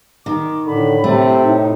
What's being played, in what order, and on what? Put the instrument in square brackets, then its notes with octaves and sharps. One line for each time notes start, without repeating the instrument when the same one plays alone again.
[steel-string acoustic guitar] D#3 [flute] D6
[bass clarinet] A2 [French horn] D3 [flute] B5
[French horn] C3 [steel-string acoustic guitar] A3
[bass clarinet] A2 [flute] D#4